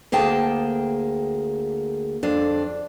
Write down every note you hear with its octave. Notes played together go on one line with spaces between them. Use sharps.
D2 A#3 G#4 G5 A5
F2 D4